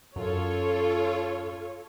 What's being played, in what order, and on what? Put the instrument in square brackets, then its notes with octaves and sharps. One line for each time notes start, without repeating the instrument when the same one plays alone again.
[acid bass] F#2 [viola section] F4 A4 C#5